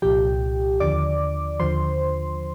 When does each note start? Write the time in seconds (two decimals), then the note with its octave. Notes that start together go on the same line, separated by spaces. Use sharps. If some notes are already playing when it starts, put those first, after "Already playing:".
0.02 C2 A#2 F3 G4 G5
0.80 D#2 D3 F3 D5 D6
1.59 D#2 D3 F3 C5 C6